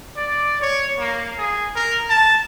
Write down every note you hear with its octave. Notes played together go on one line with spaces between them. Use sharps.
D5
C#5
A#3
G#4
A#4
A5